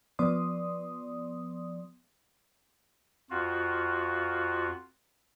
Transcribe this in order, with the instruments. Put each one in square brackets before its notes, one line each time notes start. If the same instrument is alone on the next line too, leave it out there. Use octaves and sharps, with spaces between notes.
[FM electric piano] F3 B3 D5 C6 D#6
[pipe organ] F2 F4 F#4